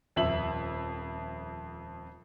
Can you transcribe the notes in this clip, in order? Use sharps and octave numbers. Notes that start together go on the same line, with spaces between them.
D#1 F2 E5 F#7